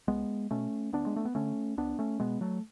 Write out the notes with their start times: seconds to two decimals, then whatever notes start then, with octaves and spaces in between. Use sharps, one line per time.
0.08 C#2 G#3 B3
0.51 B2 A3 C#4
0.93 D2 B3 D4
1.06 G#3
1.16 A3
1.25 B3
1.35 D3 A3 C#4
1.77 C#2 B3 D4
1.99 A3 C#4
2.20 B2 G#3 B3
2.41 F#3 A3